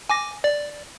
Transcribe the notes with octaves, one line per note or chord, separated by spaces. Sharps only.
G#5 D6 A#6
D5